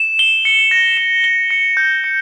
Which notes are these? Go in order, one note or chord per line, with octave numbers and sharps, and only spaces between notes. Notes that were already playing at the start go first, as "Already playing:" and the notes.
Already playing: E7
G7
C#7
A#6
E7
G7
C#7
G6
C#7